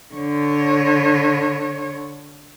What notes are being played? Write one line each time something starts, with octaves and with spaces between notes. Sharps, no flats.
D3 C#5